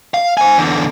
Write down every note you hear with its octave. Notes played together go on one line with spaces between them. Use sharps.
F5
C5 G#5
E2 D3